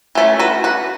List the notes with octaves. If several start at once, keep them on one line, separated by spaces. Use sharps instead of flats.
E3 A3 C#4
F#4 B4
F#4 B4